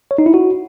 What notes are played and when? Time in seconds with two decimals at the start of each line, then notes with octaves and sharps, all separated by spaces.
0.11 C#5
0.18 D#4
0.26 E4
0.34 F#4